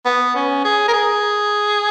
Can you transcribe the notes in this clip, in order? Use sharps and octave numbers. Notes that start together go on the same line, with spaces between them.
B3
C#4
G#4
A#4
G#4